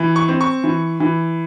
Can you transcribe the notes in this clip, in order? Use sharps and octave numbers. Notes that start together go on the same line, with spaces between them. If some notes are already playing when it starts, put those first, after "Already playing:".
Already playing: E3
C#6
C4
C#6
E3
E3